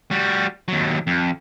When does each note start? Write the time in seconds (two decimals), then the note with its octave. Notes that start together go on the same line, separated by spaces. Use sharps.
0.11 G3 F#4
0.68 D#2 F#3
1.07 F2